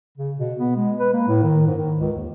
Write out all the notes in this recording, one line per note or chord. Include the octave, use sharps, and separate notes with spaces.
C#3
B2
B3
G#3
B4
A#3
A2
D#3
G#2
D#3
C#2
D#2